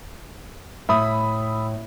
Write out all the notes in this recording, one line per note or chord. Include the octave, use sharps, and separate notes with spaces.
A2 E5 B5 D#6